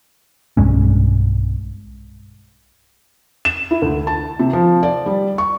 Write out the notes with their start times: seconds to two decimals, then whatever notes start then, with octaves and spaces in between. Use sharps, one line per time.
0.57 B1 G2 G#3 C#4
3.45 E7
3.71 E4
3.82 D2
4.07 A5
4.40 C3
4.53 F3
4.83 D5
5.06 G3
5.38 C#6